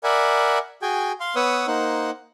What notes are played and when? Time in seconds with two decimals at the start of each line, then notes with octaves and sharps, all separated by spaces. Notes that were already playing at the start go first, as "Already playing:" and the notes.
0.04 A#4 D5 E5 F#5 G#5 B5
0.82 F#4 G#4 G5 G#5
1.20 F5 C6
1.36 B3 B4 C#5 F#5 D#6 E6
1.67 A#3 D#4 C5 F#5